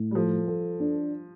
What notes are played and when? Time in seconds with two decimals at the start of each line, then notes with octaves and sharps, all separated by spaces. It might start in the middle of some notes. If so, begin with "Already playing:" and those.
Already playing: A2
0.11 G3
0.15 F3 A4
0.48 A4
0.80 D4